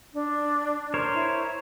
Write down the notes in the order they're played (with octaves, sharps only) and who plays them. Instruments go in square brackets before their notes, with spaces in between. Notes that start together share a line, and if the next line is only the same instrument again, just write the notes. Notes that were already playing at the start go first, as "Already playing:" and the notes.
[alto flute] D4
[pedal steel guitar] A#4 C5 C#5
[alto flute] E4